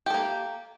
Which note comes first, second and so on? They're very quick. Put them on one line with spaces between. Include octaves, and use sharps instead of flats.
G4 A4 A#3